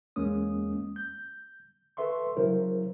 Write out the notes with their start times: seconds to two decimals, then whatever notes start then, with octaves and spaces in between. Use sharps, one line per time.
0.16 E2 G#3 A#3 C#4 D#6
0.96 G6
1.97 A4 B4 E5 C6 C#6
2.36 C#3 F#3 E4 A#4 C5